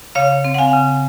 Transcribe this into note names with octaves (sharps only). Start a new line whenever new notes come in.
C#3 C#5 F5
C4
F#5
F5 G#5
C#3